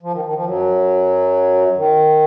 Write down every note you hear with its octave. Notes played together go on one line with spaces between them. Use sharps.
F3
D#3
D#3
F3
F#2 F#3
D#3